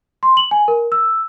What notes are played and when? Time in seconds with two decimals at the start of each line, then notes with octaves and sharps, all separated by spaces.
0.23 C6
0.37 F#7
0.51 G#5
0.68 A#4
0.92 E6